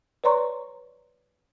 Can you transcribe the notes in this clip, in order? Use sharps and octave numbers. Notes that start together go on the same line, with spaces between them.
B4 C#5 D5 A#5 C6 C#6